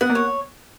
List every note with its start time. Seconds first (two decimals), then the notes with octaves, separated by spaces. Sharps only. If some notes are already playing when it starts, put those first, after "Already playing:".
0.01 B3 F#5
0.10 A#3
0.15 C#5